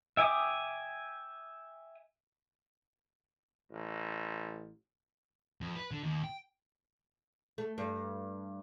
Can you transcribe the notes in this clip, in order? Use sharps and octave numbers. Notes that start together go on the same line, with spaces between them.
E5 G5 G#5 D6 D#6
A1
F2
B4
D3
D#2
G5
A3
G2